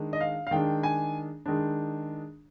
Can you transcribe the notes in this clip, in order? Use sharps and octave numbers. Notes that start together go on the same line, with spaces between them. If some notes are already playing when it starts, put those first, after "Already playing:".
Already playing: D#3 G#3 D4
D#5
F5
F5
D#3 G#3 D4 G5
G#5
D#3 G#3 D4